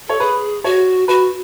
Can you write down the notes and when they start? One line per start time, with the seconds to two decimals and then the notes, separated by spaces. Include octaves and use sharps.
0.08 A4 C#5
0.20 G#4 B4
0.64 F#4 C#5
1.08 F#4 B4